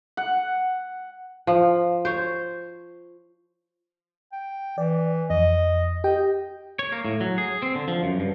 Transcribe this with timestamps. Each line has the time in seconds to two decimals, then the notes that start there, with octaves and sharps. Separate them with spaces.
0.17 F#5
1.47 F3
2.05 C5 C#5
4.33 G5
4.78 E3 D5
5.30 F2 D#5
6.04 G4 D#5 G5
6.79 C#5
6.92 A#3
7.04 A2
7.21 F#3
7.38 G#4
7.62 C4
7.75 D3
7.88 F3
8.03 F#2
8.20 G2